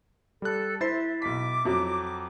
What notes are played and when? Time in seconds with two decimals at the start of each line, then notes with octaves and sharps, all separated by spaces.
0.42 G3 A4 F#6
0.81 E4 C5 E5 A6 C7
1.22 B1 D6 B6
1.65 F2 F#3 F#4